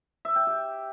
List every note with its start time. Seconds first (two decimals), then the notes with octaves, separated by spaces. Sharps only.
0.25 E5
0.36 G5
0.47 G4